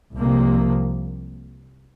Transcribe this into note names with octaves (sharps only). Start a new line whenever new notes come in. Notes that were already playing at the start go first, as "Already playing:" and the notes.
C2 C3 F3 A#3